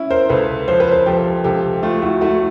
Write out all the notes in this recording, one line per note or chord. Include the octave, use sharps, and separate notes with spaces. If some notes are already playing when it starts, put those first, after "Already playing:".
Already playing: C#4 E4
A#4 C5
C#2 A4 B4
F3 C5
B4
A#4 C5
F3 G4 A4
C#2 G4 A4
A3 F4 G4
E4 F#4
A3 E4 F#4